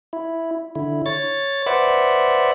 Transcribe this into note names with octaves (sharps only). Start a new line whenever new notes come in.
E4
D3 E4
C#5 A6
B4 C5 D5 E5 F#5